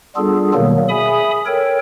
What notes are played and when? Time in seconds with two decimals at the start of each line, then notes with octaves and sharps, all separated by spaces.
0.16 G3 B3 D4 F4 G#4 A4
0.54 B2 D#3 F#3 G3 A#3 B3
0.89 G#4 E5 G#5 B5 D#6
1.46 A4 A#4 C#5 G5